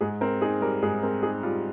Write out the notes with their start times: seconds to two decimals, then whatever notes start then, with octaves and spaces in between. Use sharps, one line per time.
0.01 G#2 G#4
0.21 C4 A#4
0.41 D#4 G#4
0.61 G3 A#4
0.82 G#2 G#4
1.03 C4 A#4
1.23 D#4 G#4
1.43 G3 F4